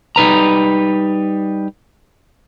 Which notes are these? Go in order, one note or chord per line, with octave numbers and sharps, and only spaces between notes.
G3 D#4 B4 A#5